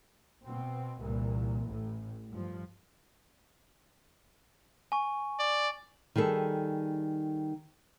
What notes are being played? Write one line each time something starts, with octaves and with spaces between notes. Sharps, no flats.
B2 C4
C2 A#2 E3
A1 A2
G2 F3
G#5 C#6
D5
D#3 G3 G#4 A4